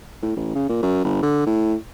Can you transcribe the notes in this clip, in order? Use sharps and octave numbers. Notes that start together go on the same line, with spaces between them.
A2
A1
C#3
A#2
F#2
G1
D3
A2